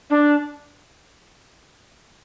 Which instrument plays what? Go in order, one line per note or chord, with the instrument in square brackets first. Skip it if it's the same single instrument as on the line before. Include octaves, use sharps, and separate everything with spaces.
[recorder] D4